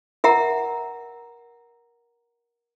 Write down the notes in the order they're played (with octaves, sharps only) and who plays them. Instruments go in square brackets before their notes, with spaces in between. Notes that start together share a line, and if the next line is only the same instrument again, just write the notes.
[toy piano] A#4 E5 F#5 A#5